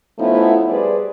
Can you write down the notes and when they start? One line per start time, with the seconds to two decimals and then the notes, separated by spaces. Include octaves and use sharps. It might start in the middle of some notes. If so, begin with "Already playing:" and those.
0.19 F3 A3 B3 C#4 D#4 E4
0.69 G3 G#4 B4 C5 D5